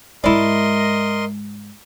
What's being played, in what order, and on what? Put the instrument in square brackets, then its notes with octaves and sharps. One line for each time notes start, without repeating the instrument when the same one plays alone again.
[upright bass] G#2 G#3 [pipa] E4 D5 [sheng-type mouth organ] A#4 D#5 C6